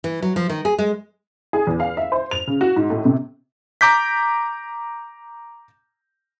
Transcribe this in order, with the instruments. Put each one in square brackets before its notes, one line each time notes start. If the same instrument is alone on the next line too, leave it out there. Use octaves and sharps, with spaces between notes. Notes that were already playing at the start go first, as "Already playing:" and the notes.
[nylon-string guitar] E3
F#3
F3
D#3
G#4
G#3
[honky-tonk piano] G#4
E2
F5
E5
C5
F7
C#3
F#4
G#2
A2
C3
[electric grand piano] A#5 D6 G6 B6